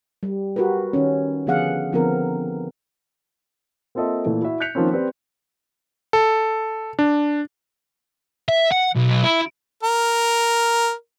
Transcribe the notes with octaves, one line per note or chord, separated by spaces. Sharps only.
G3
F#4 G4 A#4 B4
D#3 C#4
D3 F3 B3 G#4 F5 F#5
D3 F3 B3 C4 A#4
A#3 C4 F4 A4 D#5 E5
A#2 E3 A3
E4 F#4 E5
F#6 G6 B6 C#7 F7
D#3 F3 A#3 C4 C#4
C4 G4 B4 D5
A4
D4
E5
F#5
B1
E4
A#4